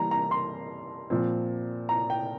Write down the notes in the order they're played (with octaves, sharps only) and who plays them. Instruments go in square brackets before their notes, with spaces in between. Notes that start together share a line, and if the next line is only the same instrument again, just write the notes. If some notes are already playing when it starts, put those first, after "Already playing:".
Already playing: [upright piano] E3 G3 A#3 A#5
A#5
C6
A#2 F3 C4
A#5
G5